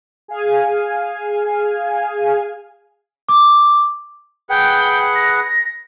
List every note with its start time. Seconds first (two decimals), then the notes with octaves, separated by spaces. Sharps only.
0.28 G#4 F5 G#5
3.29 D6
4.49 G#4 B4 F#5 G5
5.15 A#6